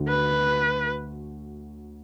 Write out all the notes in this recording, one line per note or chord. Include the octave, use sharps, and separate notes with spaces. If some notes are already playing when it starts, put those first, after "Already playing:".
Already playing: D2 D3 A3 F#4
B4